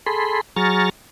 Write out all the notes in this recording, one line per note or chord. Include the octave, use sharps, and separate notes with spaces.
G#4 A4 B5 C6
F#3 G#4 A#5 C#6 F6 A6